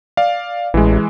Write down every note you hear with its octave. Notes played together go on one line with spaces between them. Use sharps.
D5 F5
A1 E3 G#3